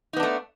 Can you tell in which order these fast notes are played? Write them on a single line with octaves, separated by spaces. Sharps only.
D#4 B3 D4 A3